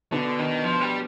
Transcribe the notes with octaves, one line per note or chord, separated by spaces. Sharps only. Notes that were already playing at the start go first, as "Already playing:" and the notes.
B2 D3 B3 D4
D#3
F3
G3